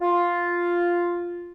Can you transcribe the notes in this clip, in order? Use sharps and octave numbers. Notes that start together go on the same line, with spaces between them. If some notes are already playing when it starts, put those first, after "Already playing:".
F4